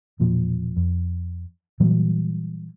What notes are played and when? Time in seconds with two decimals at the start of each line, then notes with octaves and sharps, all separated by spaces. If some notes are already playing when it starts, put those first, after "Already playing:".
0.20 E1 A#2 F3
0.76 F2
1.80 A#2 E3 F#3 G3